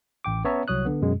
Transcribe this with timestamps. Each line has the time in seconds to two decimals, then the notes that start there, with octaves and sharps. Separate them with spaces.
0.24 A1 G5 D6
0.45 B3 C#4 C#5 E5 A5 A#5
0.68 C2 F#3 C#5 D#6 F#6
0.85 D3 B3
1.02 F#2 B2 G#3